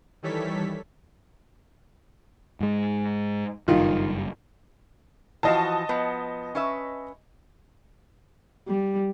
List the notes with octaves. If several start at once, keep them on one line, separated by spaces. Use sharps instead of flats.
D#3 E3 G3 A4 C#5 B6
G#2 G#3
F#1 G2 D#3 F4
E3 F3 F#4 D#5 A5
F3 B3
C#4 B4 E5
G3